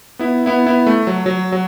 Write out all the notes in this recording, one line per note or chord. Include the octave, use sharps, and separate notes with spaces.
B3 E4
B3 E4
B3 E4
A3
F#3
F#3
F#3